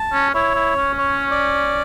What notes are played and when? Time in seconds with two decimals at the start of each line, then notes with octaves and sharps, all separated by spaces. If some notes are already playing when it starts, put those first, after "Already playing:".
Already playing: A5
0.13 C#4
0.34 E4 C#5
0.55 E4
0.76 C#4
0.98 C#5
1.31 D5